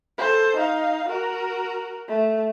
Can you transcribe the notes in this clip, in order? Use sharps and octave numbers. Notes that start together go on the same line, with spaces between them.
A4 C5
D#4 F5
F#4 A#4
A3